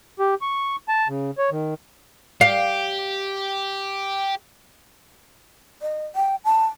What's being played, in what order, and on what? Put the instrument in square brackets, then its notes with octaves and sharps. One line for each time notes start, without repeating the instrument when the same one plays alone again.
[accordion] G4
C#6
A5
C#3
C#5
D#3
[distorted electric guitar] G4 [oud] F5
[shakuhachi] D#5
G5
A5